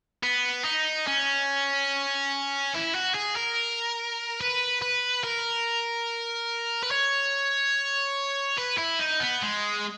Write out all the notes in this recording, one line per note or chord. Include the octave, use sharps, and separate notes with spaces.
B3
D#4
C#4
E4
F#4
G#4
A#4
B4
B4
A#4
B4
C#5
B4
E4
D#4
B3
G#3